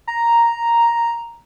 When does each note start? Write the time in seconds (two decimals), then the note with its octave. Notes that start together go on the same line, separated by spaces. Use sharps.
0.08 A#5